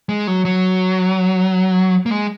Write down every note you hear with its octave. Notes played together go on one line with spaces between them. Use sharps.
G#3
F#3
F#3
A#3
G#3